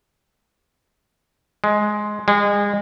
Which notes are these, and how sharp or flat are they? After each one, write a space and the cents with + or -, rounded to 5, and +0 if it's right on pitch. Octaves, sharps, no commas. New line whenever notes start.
G#3 +10
G#3 -30